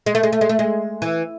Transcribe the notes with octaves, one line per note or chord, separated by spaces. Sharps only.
G#3
A3
G#3
A3
G#3
A3
G#3
E3